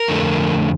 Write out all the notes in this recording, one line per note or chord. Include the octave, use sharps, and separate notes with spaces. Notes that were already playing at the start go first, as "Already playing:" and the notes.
Already playing: A#4
F2 D3 A3